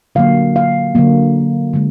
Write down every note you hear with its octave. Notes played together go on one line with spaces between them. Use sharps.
D3 F#3 A#3 F5
F5
D3 F#3 A#3
D3 G#3